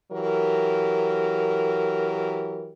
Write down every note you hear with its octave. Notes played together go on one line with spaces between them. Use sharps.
E3 F#3 G4 A#4